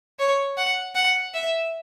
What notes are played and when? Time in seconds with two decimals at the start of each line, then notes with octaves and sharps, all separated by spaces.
0.19 C#5
0.57 F#5
0.95 F#5
1.34 E5